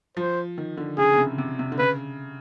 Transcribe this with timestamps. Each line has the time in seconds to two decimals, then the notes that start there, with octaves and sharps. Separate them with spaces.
0.17 F3 C5
0.58 D#3
0.77 D3
0.98 C#3 G#4
1.13 C#3
1.18 C3
1.38 C3
1.59 C3
1.72 D3
1.79 C#3 B4